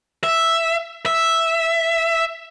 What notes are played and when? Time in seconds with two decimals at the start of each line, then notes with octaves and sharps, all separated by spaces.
0.24 E5
1.06 E5